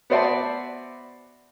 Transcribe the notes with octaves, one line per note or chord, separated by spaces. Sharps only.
B3 F#4 C5 D5 E5 A5